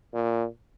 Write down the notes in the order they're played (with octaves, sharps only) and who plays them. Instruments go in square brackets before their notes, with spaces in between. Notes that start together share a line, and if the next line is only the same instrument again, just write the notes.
[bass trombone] A#2